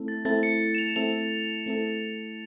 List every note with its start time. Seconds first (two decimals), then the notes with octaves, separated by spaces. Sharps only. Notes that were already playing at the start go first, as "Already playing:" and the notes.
Already playing: A3 C4 E4 A4
0.08 A6
0.25 A3 C4 E4 A4 A6
0.43 C#7
0.75 E7
0.78 F7
0.96 A3 C4 E4 A4 F7
1.66 A3 C4 E4 A4